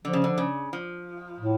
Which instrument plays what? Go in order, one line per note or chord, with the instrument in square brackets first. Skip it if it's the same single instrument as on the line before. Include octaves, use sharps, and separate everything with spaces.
[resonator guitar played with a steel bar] D3 [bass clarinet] F3
[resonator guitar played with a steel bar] C#3
D3
C#3
F3
[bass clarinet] A2